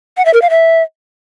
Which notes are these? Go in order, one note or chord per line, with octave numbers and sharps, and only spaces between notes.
F#5
E5
A#4
F5
E5